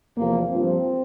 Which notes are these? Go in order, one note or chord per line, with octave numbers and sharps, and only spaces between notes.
E2 C3 F3 A#3
G2 F3 C4